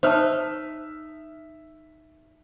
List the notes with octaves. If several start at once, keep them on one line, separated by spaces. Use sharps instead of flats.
D#4 C5 E5 A5 F6